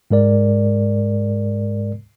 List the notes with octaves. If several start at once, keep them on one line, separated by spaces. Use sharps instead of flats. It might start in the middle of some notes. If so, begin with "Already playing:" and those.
G#2 G#3 A#4 D5